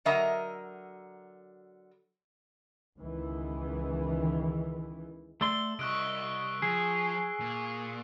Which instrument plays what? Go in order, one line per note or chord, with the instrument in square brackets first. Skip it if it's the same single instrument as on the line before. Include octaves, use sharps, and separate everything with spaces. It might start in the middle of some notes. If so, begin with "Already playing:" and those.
[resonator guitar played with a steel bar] D3 F#3 A#4 D#5 E5 A#5
[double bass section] C#2 D#3 E3
[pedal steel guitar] A3 D5 C6 [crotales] E6 G7
[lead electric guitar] C2 [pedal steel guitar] D#5 [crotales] C#6 F#6 D7
[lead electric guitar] F3 [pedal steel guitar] G#4
[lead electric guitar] A#2